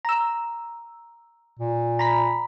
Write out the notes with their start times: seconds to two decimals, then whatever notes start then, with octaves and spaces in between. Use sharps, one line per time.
0.05 A#5 E6
1.59 A#2
1.99 A#5 B5 B6